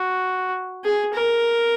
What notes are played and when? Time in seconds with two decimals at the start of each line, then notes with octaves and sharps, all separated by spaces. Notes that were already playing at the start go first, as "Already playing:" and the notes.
Already playing: F#4
0.84 G#4
1.13 A#4